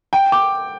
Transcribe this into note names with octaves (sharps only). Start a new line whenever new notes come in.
G5
D6